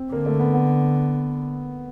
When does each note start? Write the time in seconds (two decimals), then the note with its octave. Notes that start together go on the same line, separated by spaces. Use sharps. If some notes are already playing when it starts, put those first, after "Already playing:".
Already playing: C4
0.12 D3 A#3
0.26 A3
0.39 B3
0.54 B3